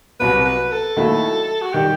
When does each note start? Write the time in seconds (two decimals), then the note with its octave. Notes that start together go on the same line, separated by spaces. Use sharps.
0.20 C2 C3 F#3 B3 B4
0.45 B4
0.71 A4
0.96 D#2 D#3 F#3 A3 E4
1.62 F#4
1.72 D#3 G3 G4